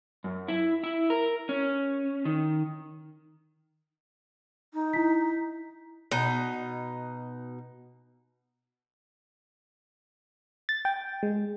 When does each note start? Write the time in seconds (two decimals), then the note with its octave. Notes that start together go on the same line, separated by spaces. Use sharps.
0.24 F#2
0.48 E4
0.84 E4
1.10 A#4
1.49 C#4
2.25 D#3
4.73 D#4
4.93 E4 B6
6.11 B2 D#4
10.69 A6
10.85 G5
11.23 G#3